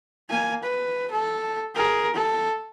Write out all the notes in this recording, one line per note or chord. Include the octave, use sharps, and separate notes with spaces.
A#3 G#5
B4
A4
G#4 A#4
A4